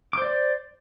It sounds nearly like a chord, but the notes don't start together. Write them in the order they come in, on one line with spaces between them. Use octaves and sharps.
D6 C5 D5